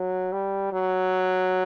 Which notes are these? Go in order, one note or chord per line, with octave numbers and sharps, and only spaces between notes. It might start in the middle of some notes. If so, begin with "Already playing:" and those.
Already playing: F#3
G3
F#3